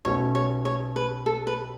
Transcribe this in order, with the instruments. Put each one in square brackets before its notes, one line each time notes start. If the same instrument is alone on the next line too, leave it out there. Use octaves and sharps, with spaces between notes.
[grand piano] B1 B2 A3 C#4 [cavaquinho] C#5
[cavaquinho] C#5
C#5
B4
A4
B4